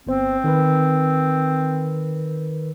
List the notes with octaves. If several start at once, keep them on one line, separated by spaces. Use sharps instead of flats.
G1 B3 C4 C5
D#3 A#4 B4